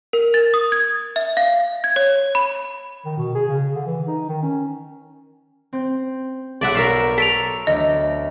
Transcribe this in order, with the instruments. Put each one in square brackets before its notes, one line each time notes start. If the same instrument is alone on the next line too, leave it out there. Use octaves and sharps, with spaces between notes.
[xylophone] A#4
A6
D#6
G#6
E5
F5
G#6
C#5
B5
[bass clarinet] D#3
B2
G#4
C#3
D3
E3
D#4
D#3
C#4
[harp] C4 G6
[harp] B1 [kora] D5 E5 F#5
[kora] A#4 E5 F5 [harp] C#6 G6
[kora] A4 [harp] A#5 C#6 A6 [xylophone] B6 D7 F7
[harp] D2 F#3 E5 [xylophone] D#5